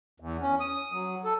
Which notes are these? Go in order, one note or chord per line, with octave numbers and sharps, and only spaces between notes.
E2
C#4
D#6
F#3
A4